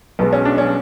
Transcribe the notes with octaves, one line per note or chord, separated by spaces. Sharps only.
B1 B2 G#3 B3
C#4
D4
C#4